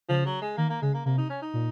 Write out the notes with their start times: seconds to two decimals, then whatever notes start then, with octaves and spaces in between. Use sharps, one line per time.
0.09 C#3 F3
0.26 F#3
0.41 G#3
0.57 D#3 A#3
0.69 A#3
0.82 C#3 G#3
0.94 A#3
1.06 C3 A#3
1.18 D#4
1.30 C#4
1.42 D#4
1.54 A#2